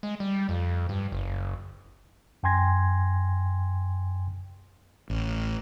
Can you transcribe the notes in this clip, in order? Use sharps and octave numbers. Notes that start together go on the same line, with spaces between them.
G#3
G3
F2
G2
F#1
F#2 G5 G#5 C6 G#6 A#6
A1